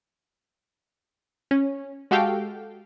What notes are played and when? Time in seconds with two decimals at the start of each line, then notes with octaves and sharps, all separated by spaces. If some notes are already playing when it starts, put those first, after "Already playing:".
1.51 C#4
2.11 G#3 F#4 G4 A4 F5 G5